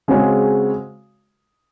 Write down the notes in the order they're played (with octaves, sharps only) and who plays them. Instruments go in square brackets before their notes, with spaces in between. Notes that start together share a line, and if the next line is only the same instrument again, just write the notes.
[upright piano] C#3 G#3 C4 F#4 C#5